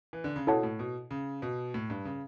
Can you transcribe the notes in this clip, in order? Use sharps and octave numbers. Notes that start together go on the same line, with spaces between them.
E3
D3
C#3
B2 E4 A4 C#5 F#5 A5
A2
B2
C#3
B2
A2
G2
C#3